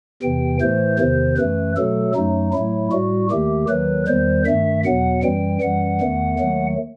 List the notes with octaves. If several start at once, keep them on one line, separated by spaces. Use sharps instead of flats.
E2 C3 E3 G5
A2 E3 A3 C5
E2 C3 D#3 C5
F#2 E3 A3 B4
B2 F#3 A3 A4
F#2 F#3 A3 D#4
A2 F#3 A3 E4
A2 G3 F#4
D#2 D#3 A3 G4
D#2 D#3 F#3 B4
E2 D#3 G3 C5
G2 D#3 A3 E5
E2 B2 F#3 F#5
F#2 E3 G3 G5
F#2 E3 G3 F#5
E2 D#3 A3
D#2 D#3 F#3 A3